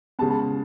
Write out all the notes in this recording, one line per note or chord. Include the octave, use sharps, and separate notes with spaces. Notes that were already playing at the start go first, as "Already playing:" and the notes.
C#3 G#3 B3 A5
A5